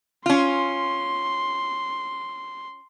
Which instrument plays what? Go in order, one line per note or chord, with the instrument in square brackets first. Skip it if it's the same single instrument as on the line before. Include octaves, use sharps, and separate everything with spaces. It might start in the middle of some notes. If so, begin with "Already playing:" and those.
[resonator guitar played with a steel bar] C#4 F4 [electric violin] C6